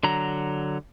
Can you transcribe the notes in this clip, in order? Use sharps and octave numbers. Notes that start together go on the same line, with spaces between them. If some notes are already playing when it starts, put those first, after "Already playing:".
D3 F#3 A#5